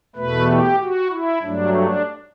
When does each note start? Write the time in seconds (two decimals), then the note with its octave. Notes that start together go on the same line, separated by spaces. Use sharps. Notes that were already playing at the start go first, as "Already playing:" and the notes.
0.16 E2 B2 A3 B4
0.48 G4
0.79 F#4
1.10 E4
1.42 G2 F#3 A3 D4
1.74 D4